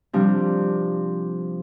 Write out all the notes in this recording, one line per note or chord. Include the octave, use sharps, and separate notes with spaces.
C3 F3 G3 D4